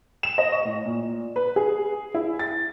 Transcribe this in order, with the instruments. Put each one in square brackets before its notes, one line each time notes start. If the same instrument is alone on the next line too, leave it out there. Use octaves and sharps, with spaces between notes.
[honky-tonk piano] E7
D#5
C#6
A2
A#2
B4
G#4
E4
A6